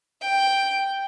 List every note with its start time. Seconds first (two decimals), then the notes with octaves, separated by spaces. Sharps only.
0.21 G5